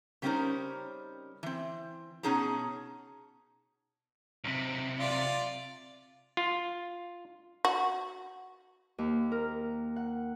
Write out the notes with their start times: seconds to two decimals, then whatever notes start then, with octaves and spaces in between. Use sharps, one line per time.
0.22 C#3 G3 C4 C#4 D#4 A#4
1.43 E3 C4
2.23 B2 C#4 D#4 G#4 A5 A#5
4.44 B1 C3
5.00 F4 D5
6.37 F4
7.65 F#4
8.98 D#2
9.32 A#4
9.96 F#5